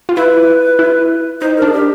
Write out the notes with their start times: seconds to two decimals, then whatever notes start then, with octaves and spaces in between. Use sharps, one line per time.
0.09 F4
0.16 E4 B4
0.79 E4
1.41 D#4 C5
1.57 A#4
1.62 D4
1.68 G#4
1.73 G4